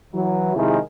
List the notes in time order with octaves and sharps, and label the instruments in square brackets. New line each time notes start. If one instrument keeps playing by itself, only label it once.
[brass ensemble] E3 F#3
C3 D#3 F3 G#3 E4 G#4